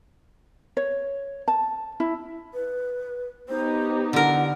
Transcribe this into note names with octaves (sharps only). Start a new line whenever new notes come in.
C#5
A5
E4
B4
B3 D#4 G4 C5
D3 E4 A#4 F#5